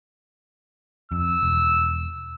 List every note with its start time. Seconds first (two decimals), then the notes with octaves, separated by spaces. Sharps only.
1.12 F2 E6
1.43 E1